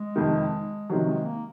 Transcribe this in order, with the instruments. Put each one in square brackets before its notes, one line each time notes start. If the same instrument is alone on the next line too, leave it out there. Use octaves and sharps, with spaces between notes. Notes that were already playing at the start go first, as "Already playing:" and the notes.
Already playing: [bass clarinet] G#3
[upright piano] F2 C3 D#3
[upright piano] C3 D#3 F#3 [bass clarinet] F3
[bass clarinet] G#3
A#3